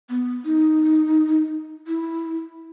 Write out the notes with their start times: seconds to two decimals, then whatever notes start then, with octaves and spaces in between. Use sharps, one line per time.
0.10 B3
0.45 D#4
1.87 E4